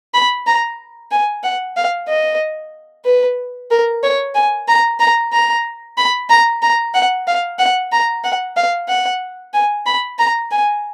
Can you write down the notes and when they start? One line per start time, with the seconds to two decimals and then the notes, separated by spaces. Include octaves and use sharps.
0.14 B5
0.47 A#5
1.12 G#5
1.43 F#5
1.77 F5
2.08 D#5
3.05 B4
3.71 A#4
4.03 C#5
4.35 G#5
4.68 A#5
5.00 A#5
5.33 A#5
5.98 B5
6.30 A#5
6.62 A#5
6.94 F#5
7.27 F5
7.59 F#5
7.92 A#5
8.24 F#5
8.57 F5
8.89 F#5
9.54 G#5
9.86 B5
10.19 A#5
10.51 G#5